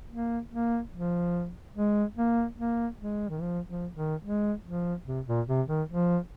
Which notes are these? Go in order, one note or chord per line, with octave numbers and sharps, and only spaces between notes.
A#3
A#3
F3
G#3
A#3
A#3
G#3
D#3
F3
F3
D#3
G#3
F3
C3
A#2
C3
D#3
F3